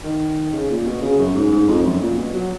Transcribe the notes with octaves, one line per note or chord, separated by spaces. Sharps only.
D#3
C#3
A#2
B2
C#3
F#2
G#2
G#2
F2
F#2
A#2
B2
F#3